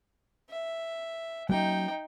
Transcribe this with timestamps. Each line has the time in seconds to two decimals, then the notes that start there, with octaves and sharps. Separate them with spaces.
0.50 E5
1.49 F#3 A#3 C#4 D#4 G5